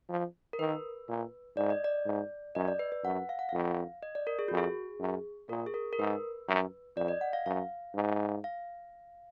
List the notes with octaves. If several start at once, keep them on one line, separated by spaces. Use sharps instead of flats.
F3
A#4
D#3 B4
A#2
G#2 D5
D#5
D5
G#2
F#2 D#5
D5
B4
B4
F#2 F#5
F5
F#5
F2 F5
D#5
D5
A#4
G#4
F2 F#4
G#4
F#2
A#2 A#4
G#4
A#4
A#4
G#2 B4
F#2
F2 D5
D#5
F#5
F5
F#2 F5
G#2
F5